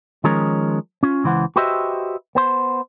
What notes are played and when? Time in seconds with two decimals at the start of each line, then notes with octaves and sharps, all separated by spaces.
0.24 D#3 F3 G#3 C#4 A#4 C#5
1.03 C#4 F4
1.24 C#2 E3 C5 F#5
1.56 F#4 G4 B4 C5 D#5 E5
2.35 B3 C5 C6